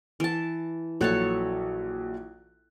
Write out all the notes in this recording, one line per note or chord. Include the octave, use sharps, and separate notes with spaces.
E3 A5
A#1 F#3 A4 C#5 A5 F#6